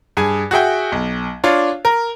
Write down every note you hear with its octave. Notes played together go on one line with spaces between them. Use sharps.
G2 G#4 G#5
F#4 G#4 E5 G5
B1
D4 F4 C#5
A#4